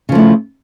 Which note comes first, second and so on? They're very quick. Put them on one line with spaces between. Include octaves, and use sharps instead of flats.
C#3 F3 A3 E4